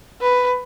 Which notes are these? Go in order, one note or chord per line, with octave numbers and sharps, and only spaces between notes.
B4